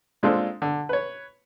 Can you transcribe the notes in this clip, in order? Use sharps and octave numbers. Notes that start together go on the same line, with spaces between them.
A#2 G#3 C4 D4 F4 A4
D3
B4 C#5